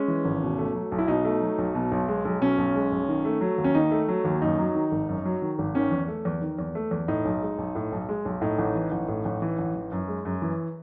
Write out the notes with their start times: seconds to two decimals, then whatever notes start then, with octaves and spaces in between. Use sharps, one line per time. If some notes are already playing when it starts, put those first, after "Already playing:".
Already playing: G#3 C#4
0.08 E3
0.25 G#1
0.42 B2
0.58 A3
0.75 F#3
0.92 B1
0.99 E4
1.08 B2 D#4
1.25 A3
1.42 F#3
1.58 B1
1.75 B2
1.92 B1
2.08 G#3
2.25 B1
2.42 B2 C#4
2.58 B1
2.75 G#3
2.92 B1
3.09 D#3
3.25 A3
3.41 F#3
3.58 D#2
3.64 C#4
3.75 D#3 D#4
3.91 A3
4.08 F#3
4.25 D#2
4.42 F#2 D#4
4.59 F#3
4.75 D#3
4.91 G#1
5.08 F#2
5.25 F#3
5.42 D#3
5.59 G#1
5.75 D#3 C#4
5.91 E2
6.08 A3
6.25 E2
6.42 D#3
6.58 E2
6.75 A3
6.91 E2
7.08 A2 D#4
7.25 B1
7.42 G#3
7.58 B1
7.75 A2
7.92 B1
8.09 G#3
8.25 B1
8.41 A2 D#4
8.59 A1
8.75 E3
8.92 A1
9.08 A2
9.25 A1
9.42 E3
9.59 A1
9.76 E3
9.92 F#2
10.08 G#3
10.25 F#2
10.42 E3